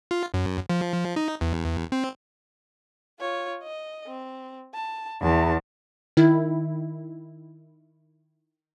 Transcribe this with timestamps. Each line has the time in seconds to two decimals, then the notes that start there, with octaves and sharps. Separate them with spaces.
0.11 F4
0.34 F#2
0.69 F3
1.16 D#4
1.41 E2
1.92 C4
3.20 F4 C#5
3.63 D#5
4.07 C4
4.74 A5
5.21 E2 E4 A5
6.17 D#3 E4